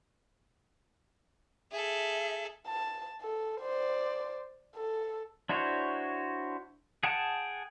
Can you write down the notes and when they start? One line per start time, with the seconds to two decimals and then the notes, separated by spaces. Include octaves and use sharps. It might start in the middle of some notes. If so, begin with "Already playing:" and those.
1.72 G#4 A4 E5
2.67 A5
3.21 A4
3.61 C5 D5
4.76 A4
5.49 D4 E4 F#4 C5 C#5
7.03 G#4 F#5 G5 A5